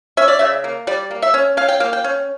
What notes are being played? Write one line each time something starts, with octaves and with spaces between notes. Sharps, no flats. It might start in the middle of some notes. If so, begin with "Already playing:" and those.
C#4 E5
D5
C#3 E5
A#3
G3 D5
A#3
E5
C#4
C#4 F5
G5
A#3 F5
G5
C#4